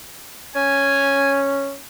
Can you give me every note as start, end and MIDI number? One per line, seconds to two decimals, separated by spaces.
0.55 1.76 61
0.55 1.36 80